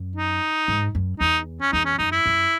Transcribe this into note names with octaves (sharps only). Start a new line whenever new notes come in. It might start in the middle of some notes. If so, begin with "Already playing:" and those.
Already playing: F#2
D#4
G#2
F#2
E2 D#4
C#4
E2 D#4
C#4
F#2 D#4
E4
F#2